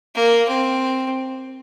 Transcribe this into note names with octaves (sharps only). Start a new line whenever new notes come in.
A#3
C4